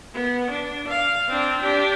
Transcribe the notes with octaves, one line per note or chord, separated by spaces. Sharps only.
B3
D4
F5
C4 D4
D4 G4